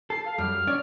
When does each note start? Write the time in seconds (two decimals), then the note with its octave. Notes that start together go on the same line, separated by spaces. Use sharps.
0.10 A4 C7
0.25 F5
0.38 F#2 G3 F6
0.67 C#4 C#5 D5